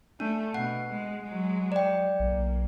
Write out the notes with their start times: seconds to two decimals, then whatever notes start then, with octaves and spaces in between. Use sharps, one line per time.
0.20 A3 D4
0.54 B2 F#5
0.93 G#3
1.24 F#3 G#3
1.72 D5 G5
2.20 B1 A#3